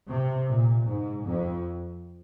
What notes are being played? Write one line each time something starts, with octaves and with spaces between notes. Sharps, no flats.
C3
A#2
G#2
F2